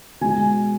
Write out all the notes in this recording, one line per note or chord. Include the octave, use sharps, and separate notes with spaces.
B2 G#3 G#5